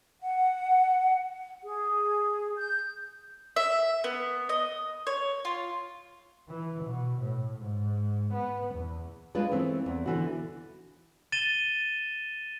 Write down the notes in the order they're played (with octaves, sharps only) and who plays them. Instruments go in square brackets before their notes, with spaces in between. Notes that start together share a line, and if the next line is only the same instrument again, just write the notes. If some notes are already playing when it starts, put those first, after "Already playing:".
[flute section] F#5
G#4
G6
[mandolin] E5
B3
D#5
C#5
F4
[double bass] E3
B2
A2
G#2
B3
E2
[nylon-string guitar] G#3 A#3 D4 F4 B4
E3 A3 C4
E2
D3 E3 F#4
[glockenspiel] A6 D#7 E7 G7